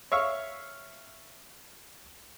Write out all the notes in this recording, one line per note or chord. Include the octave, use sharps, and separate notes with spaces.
C#5 E5 F5 C#6